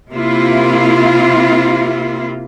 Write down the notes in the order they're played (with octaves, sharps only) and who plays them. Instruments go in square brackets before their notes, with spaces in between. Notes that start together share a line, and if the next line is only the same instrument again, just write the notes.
[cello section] C3 A#3 E4 F4